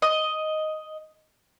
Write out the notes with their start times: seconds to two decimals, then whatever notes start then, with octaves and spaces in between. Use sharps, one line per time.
0.02 D#5